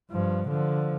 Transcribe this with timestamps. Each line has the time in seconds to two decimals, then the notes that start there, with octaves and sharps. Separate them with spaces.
0.11 G2 F3
0.48 D3 F3